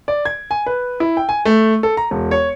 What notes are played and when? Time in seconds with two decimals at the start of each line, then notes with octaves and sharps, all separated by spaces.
0.08 D5
0.25 G#6
0.51 G#5
0.66 B4
1.00 E4
1.17 G5
1.29 G#5
1.45 A3
1.83 A4
1.97 A#5
2.11 E1
2.31 C#5